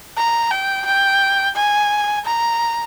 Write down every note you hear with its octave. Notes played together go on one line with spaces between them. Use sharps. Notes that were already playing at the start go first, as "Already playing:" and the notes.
A#5
G5
G5
G#5
A#5